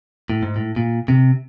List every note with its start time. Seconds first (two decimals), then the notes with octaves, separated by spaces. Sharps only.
0.30 A2
0.43 G#2
0.56 A2
0.76 A#2
1.08 C3